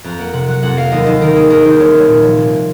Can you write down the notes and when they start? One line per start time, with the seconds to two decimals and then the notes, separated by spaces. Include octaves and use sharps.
0.04 F2 A#5
0.18 A#3 F#5
0.33 C3 F#5
0.48 F#3 F#5
0.63 F2 F#5
0.77 A#3 F5
0.92 D#2 D#5
1.06 D#2 D#5
1.21 D#3 A#4
1.35 A#3 G#4
1.50 D#2 A#4
1.65 D#2 C5
1.79 C2 C#5
1.94 C2
2.01 C#5
2.08 A#2
2.22 F3 C#5
2.37 C2